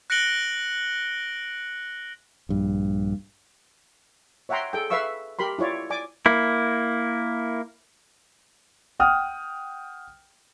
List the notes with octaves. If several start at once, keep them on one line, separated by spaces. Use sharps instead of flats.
F#6 A#6 C#7 D7 F#7 G7
A#1 G2
C#5 E5 F#5 G5 A#5 C6
G#4 A4 G5
B4 E5 F5 C#6 E6
G4 A#4 B5 C6
E4 F4 C#5 D5
D5 G#5 D6
A#3 E4
F#5 G5 D#6 F6